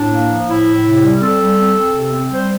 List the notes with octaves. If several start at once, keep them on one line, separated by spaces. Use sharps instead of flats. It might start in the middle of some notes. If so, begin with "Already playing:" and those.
Already playing: A2 D4
A#3
F3
A2 E4
A2
C3
G3
C4 A4
G3
C4
C4
C3
C4
G3 C5